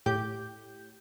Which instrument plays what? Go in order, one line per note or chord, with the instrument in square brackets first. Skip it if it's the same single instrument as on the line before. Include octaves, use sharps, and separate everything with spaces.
[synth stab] A2 G4 G6